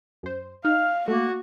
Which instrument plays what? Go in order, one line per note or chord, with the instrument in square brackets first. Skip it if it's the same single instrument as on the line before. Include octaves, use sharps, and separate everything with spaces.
[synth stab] F#2 C5
[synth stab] D#4 [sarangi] F5 [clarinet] F6
[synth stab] A3 [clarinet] A#3 [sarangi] F#4